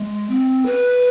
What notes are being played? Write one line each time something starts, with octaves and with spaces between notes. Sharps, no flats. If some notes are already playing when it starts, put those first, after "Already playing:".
Already playing: G#3
C4
B4